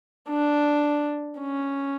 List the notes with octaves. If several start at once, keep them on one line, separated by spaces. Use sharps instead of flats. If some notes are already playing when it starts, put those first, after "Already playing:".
D4
C#4